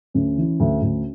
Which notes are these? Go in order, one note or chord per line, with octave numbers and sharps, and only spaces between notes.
D2 C#4
E3
D2
D2